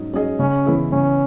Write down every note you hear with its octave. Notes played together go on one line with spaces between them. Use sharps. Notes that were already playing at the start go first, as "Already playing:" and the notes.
Already playing: G#2 F#3 C#4 D#5
F#3 C#4 G#4 D#5
C#3 C#4
E3 B3 E4 G#4
C#3 C#4